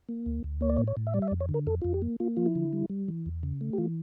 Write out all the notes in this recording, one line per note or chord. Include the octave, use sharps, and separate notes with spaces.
A#3
D2
D2
A#3 C#5
D5
A2 C#5
C#5
A2
E5
G3 D5
E5
D5
F2
C#5
D3
A#4
F2 A4
F2 F4
G4
A#3
A#3 F4
F3 F4
E4
D3
G3
G3
E3
E2
C#3
A3
G4
E3 F4